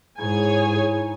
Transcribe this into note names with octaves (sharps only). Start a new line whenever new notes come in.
G#2 D#4 E4 G#4 C#5 G#5